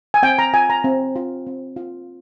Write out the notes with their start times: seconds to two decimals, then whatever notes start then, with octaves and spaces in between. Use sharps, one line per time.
0.14 G#5
0.23 C4 G5
0.39 A#5
0.53 F4 G#5
0.70 A#5
0.84 C4
1.16 F4
1.46 C4
1.76 F4